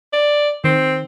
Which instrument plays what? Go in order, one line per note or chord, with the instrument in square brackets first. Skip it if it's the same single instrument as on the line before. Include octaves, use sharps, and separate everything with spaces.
[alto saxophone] D5
[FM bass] D#3 [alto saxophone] C4